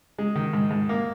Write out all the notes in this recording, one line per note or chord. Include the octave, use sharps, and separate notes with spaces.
G#3
D#3
G#2
G#2
A#3